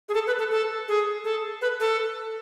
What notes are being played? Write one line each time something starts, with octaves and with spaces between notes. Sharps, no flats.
G#4
A4
B4
A4
A4
G#4
A4
B4
A4